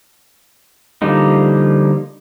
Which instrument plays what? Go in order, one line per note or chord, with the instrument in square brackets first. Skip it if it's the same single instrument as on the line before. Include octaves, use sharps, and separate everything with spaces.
[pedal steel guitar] D3 F3 G3 A#3 D#4